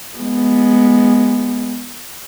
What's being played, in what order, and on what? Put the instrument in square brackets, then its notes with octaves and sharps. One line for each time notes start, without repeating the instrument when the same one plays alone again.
[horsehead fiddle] G#3 B3